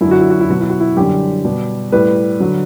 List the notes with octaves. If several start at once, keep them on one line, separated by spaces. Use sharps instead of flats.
F#2 D3 F#3 E4
F#4
E4
F#4
E4
B2 F#3 F#4
E4
F#4
E4
F#2 D3 G3 G4
B2 G3
A2 G3 B4
D3 F#3